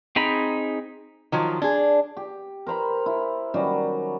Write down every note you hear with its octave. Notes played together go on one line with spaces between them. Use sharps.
C4 D#4 G#4 A#5 B5
D#3 F3 F#3
D4 G#4
G4
A#4 C5 A#5 B5
E4
D#3 F#3 G3 C#4